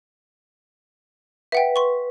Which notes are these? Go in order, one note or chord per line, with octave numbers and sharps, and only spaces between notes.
B4 E5 F#5 G5
C6 C#6